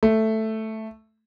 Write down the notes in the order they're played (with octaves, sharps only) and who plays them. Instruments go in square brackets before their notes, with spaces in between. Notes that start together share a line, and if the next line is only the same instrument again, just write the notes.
[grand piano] A3